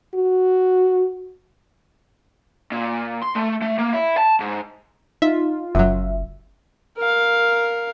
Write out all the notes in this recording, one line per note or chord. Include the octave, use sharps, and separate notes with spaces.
F#4
A#2
C6
A3
A3
A#3
E4
A5
G#2
D#4 F4 E5
F#1 F#2 F#3 E5
A#4 F5